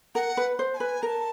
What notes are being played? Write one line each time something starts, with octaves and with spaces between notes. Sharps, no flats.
A#4 F#5
B4
C5
A5
B4 G#5
A#4 A5 A#5